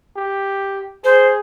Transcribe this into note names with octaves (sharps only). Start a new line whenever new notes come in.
G4
G#4 C5